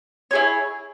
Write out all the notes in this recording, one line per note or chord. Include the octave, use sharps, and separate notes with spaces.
E4 G#4 C#5